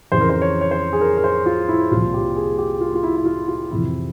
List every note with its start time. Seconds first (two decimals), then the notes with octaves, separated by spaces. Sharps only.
0.12 F2 C#3 E3 C5
0.21 A#4
0.30 C5
0.42 C#5
0.61 C#5
0.71 C5
0.93 G#4
1.01 A#4
1.17 A#4
1.24 C5
1.46 F4
1.69 E4
1.91 C2 A#2 F3 F4
2.14 G4
2.36 G#4
2.58 G4
2.81 F4
2.95 F4
3.03 E4
3.16 E4
3.26 F4
3.48 F4
3.70 F2 C3 E3 E4